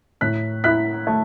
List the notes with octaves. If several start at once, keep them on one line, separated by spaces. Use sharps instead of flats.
A2 F#6 B6
E4 F#6 B6
A3